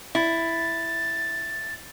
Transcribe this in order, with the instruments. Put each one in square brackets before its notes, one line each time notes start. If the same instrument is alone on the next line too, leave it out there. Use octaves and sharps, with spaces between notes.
[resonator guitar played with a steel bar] E4 [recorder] A6